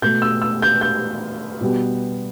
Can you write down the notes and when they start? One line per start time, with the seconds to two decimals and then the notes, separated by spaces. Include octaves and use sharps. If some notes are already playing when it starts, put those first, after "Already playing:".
0.02 B2 A3 G6
0.22 E6
0.42 E6
0.62 G6
0.81 G6
1.61 B2 G3 B3